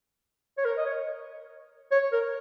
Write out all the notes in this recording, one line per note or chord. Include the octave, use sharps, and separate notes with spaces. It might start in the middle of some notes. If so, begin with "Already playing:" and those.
C#5
A#4
D#5
C#5
C#5
A#4